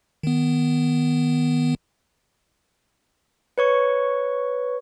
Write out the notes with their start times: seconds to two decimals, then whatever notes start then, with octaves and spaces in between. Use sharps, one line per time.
0.23 D#3 B3
3.58 B4 C#5 C#6